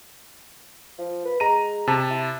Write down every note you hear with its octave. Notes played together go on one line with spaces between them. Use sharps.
F3
B4
G#3 A#5 D#7
C3 A5
E4